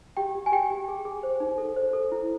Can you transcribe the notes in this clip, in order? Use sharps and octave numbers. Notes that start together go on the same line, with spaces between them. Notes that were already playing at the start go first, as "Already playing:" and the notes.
G4 G5
G4
G#5
G4 G5
G4
G#4
G#4
C5
D#4
A4
C5
A4
E4